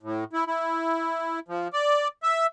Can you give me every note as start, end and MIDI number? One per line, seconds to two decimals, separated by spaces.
0.03 0.24 45
0.33 0.44 64
0.47 1.40 64
1.48 1.68 53
1.73 2.08 74
2.23 2.47 76